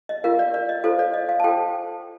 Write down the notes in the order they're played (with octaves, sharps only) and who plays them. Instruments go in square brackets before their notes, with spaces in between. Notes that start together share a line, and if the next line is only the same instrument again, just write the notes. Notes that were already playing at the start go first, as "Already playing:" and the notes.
[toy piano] D#5
F4 A#4 F5
D5
D5
D#5
F4 A4 C5 F5
D5
D#5
F5
A5
F4 A4 C5 G5